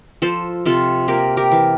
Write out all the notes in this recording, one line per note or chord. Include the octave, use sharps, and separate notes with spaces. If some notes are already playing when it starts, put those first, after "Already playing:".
F3 A4 C5
C3 F4 A4
A#3 G4 A#4
G4 A#4
E3